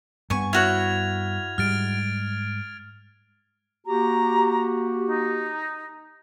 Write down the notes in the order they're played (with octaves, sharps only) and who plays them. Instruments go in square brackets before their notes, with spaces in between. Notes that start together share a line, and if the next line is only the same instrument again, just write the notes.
[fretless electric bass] G2 B3 [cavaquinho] G#5 C#6
[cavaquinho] E4 F#4 C#5 [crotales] F6 G#6 F7
[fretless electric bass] G#2 G3 G#3 [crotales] F6 A6 D7
[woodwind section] A#3 F#4 G4 [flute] A#5
[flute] D#4